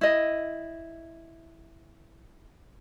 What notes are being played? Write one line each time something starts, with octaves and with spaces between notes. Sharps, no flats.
E4 D#5